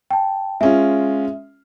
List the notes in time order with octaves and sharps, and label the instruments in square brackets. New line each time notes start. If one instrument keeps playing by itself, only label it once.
[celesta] G5 A5
[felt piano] G#3 C#4 F4 [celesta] E5